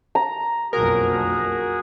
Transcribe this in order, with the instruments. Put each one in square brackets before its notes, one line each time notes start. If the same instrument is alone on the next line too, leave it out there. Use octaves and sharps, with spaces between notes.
[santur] A#5
[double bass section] F#1 B1 F2 [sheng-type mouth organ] F#4 G#4 [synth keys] A#4